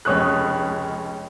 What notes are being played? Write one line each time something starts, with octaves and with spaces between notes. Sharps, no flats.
F1 C#2 C#5 D#6 F#6